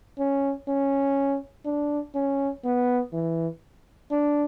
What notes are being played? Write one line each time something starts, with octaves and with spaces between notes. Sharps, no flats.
C#4
C#4
D4
C#4
B3
E3
D4